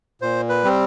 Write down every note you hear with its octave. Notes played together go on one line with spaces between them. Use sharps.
A#2 C5
B4
G3 C4